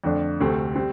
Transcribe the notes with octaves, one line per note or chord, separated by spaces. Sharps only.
F2 D3 A3 D4
D2 C3 A3 C4
G3 C4